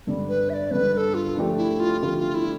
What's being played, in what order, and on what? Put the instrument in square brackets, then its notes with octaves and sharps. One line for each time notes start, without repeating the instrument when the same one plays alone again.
[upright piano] G2 D3 G3
[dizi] B4
E5
D5
[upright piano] G2 D3 G3 [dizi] B4
[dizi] B4
A4
F4
[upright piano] D3 F3 A3 D4 G4
[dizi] E4
F4
[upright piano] D3 F3 A3 D4 G4 [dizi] F4
[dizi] F4
E4